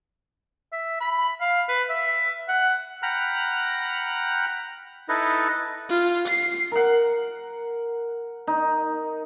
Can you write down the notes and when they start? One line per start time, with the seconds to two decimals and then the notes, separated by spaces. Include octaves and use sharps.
0.73 E5
1.01 B5
1.41 F5
1.68 B4
1.89 E5
2.49 F#5
3.03 F#5 G5 A#5 B5 F6 F#6
5.09 D#4 E4 A4 B4 D#5
5.90 F4
6.28 C7
6.71 A#4 F#5
8.47 D#4